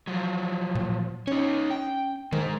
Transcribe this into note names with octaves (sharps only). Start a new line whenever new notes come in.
F3 F#3
A#2
C#4 D#4 C#5
G5
D#3 G#3 C5